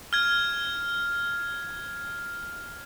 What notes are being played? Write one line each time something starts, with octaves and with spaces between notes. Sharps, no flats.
F6 G#6